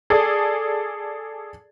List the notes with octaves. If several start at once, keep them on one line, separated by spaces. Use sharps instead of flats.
G#4 A4 D5